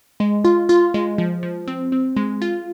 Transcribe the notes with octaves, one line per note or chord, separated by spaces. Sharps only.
G#3
F4
F4
G#3
F3
F3
C4
C4
G#3
F4